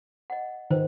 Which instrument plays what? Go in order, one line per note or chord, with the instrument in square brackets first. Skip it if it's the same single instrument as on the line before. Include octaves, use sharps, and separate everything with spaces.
[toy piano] D#5 F#5
[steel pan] D#3 [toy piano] C5